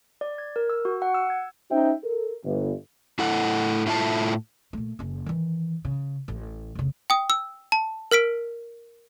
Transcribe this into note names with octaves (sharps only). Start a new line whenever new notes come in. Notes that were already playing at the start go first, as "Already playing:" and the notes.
D5
G#6
A#4
E6
F#4
F#5
E6
G#6
C#4 D#4 F#4 C5 E5 G5
A4 A#4
G1
A2 E4 A4 F#5
A2 A3 E4 F4 C#5 A5
A#2 A3
F#1 C#4
D#3 E3
C#3
A1
F1 C#3
G5 D#6
E6
A5
A#4 F6 B6 D7